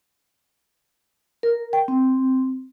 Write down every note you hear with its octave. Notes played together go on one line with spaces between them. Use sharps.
A#4
G5
C4